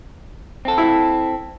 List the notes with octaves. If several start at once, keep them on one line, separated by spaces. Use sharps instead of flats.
C4 A4
E4